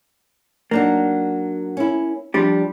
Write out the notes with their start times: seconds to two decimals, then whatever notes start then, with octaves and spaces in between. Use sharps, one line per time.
0.71 F#3 A#3 D4 D#4
1.77 C#4 E4
2.34 F3 G3 D4 G4